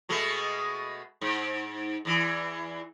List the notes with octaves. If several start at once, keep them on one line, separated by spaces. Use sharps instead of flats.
B2 G#3 A3
G#2
E2 E3